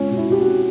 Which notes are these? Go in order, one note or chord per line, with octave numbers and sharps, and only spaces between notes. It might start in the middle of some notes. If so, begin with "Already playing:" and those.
Already playing: C#2 C#4
B2
E4
B2 G4
F#4